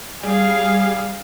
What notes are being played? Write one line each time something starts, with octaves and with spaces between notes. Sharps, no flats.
G3 G#4 F5